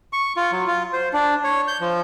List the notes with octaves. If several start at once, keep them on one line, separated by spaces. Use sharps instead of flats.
C#6
F4
F#3
F4
C5
D4
C#5
G6
F3